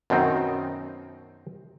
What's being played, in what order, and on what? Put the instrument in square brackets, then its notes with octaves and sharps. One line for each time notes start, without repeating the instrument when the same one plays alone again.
[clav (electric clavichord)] F#2 B2 D#3 C4 D#4